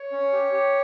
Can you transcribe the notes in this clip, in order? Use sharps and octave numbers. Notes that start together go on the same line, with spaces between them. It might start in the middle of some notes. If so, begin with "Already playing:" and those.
Already playing: C#5
C#4
G4
G4